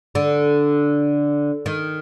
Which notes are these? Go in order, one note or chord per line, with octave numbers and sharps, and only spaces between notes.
D3
D#3